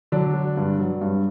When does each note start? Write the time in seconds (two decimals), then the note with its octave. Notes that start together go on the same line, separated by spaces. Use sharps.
0.12 D3 F#3 D4
0.34 F#3
0.57 G2
0.80 F#3
1.01 G2